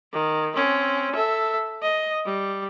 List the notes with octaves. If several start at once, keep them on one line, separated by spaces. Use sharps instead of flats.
D#3
C4 C#4
A4 E5
D#5
G3